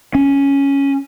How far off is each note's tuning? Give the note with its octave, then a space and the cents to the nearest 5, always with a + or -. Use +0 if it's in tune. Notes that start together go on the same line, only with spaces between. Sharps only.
C#4 +0